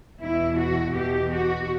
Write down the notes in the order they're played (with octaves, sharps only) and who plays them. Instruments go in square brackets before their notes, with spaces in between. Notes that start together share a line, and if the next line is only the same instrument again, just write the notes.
[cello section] E2 B2 E4
F#4
E2 B2 G4
F#4